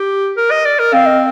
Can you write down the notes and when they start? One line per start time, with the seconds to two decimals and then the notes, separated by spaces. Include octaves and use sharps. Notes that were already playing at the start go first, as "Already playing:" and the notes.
Already playing: G4
0.37 A#4
0.51 D#5
0.65 D5
0.79 A#4
0.93 C4 F5
1.06 D#5